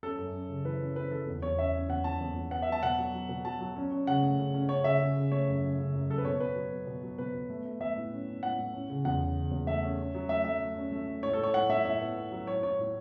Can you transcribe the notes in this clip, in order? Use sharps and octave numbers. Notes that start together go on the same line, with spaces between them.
C#4 A4
F#2
C#4
C#3
E3 B4
C#4
C#4 B4
E3 A4
E2
E2 C#5
C#4 E5
C#4
E2 F#5
E2 A5
E2
E2
B3 F#5
E5
F#3 A5
B2 F#5
F#3
F#3
B2
F#3 A5
F#3
C#4
C#4
C#3 F#5
A3
C#3
C#4
C#4 C#5
C#3 E5
C#3
C#3
A3 C#5
F#2
C#3
C#3
F#2
F#2 A4
B4
B2 C#5
B3 B4
F#3
B3
B2
F#3
B2 B4
B2
A3
A3
A3 E5
A2
C#4
C#4
A2 F#5
A2
C#4
C#3
E2 F#5
C#3
C#3
E2
A3 E5
C#4
C#4
F#3
A3 E5
A3 E5
A3
C#4
A3
A3
A2 C#5
A4
A2
C#5
A2 F#5
A2 E5
A2 E5
B3
B3
F#3
A2 C#5
A2 C#5
A2